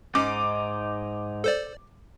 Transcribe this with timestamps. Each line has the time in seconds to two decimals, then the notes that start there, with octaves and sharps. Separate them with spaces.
0.15 G#2 C#4 D#4 D6
1.44 A4 C5 D5